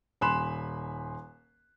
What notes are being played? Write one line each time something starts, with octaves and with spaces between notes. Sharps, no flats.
D#1 G#5 B5 C6 F#6 E7